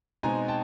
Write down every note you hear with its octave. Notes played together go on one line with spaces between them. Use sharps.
B2 G#3 C4 D#4 G#5 A#5
G5 A5